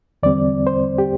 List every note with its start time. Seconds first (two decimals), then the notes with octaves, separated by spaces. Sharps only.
0.23 E2 D3 G3 C4 D5
0.67 C5
0.98 G4